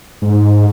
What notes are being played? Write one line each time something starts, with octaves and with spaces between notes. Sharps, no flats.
G#2